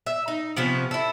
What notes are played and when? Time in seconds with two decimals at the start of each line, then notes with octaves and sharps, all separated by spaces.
0.06 E5
0.28 D#4
0.56 C3 F3 B3 C#4
0.91 E4 A4